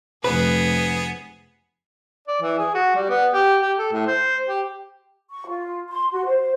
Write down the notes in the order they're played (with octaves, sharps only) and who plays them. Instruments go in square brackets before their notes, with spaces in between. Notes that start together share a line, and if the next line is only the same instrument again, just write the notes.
[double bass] F1 [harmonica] B3 G#4 [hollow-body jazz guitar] B4
[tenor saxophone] D5
E3
G#4
F#4
G3
B3
G4
G4
A4
A2
C5
G4
[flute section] C#6
F4
C6
F#4
C5